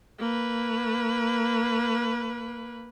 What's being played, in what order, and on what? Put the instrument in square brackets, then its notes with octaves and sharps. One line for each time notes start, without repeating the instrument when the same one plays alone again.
[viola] A#3 B4